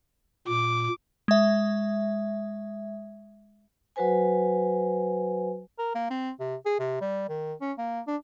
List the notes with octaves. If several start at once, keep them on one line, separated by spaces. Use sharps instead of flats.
A#2 D6
G#3 E5
F#3 F#4 B4 C5 G#5
A#4
A#3
C4
C3
G#4
C3
G3
D#3
C#4
A#3
D4